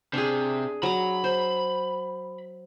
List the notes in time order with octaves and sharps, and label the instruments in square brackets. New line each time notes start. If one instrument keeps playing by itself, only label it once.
[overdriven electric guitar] C3 [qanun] D4 G#4
[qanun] F#3 A#5 [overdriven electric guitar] B5
[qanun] C5